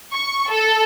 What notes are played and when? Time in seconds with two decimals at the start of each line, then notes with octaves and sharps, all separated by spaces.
0.13 C#6
0.50 A4